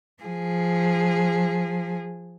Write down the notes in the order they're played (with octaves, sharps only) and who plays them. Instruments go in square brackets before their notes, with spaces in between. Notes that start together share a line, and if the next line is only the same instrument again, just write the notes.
[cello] F3 G#4